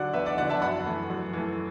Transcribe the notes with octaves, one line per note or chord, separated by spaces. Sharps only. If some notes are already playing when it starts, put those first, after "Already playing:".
Already playing: D3 F#3 D5 F#5
E2 B4 E5
D5 F#5
D3 F#3 D5 F#5
E5 A5
F#2 F#5 B5
E3 A3
F#2
E3 A3